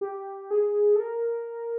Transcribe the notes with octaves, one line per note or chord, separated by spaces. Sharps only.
G4
G#4
A4
A#4